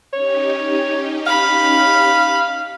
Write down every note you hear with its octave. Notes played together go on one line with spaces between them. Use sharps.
C#4 D#4 G4 C#5
F5 B5